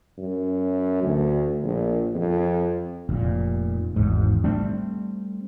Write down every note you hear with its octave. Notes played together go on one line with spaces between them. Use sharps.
F#2
D2
A#1
F2
F1 A#2
G#1 E2 G#2
G3 A3 C4 D4